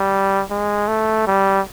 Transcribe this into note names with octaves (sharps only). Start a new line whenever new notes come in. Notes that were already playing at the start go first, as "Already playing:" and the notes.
Already playing: G3
G#3
A3
G3